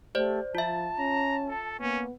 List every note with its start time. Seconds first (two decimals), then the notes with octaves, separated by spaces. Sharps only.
0.15 A3 G4 C5 D5
0.55 F3 F4 E5 A5
0.99 C#4 A#5
1.49 A4
1.80 A#3 B3 C#4